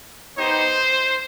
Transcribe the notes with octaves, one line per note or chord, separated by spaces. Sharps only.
B3 D#4 G4 C5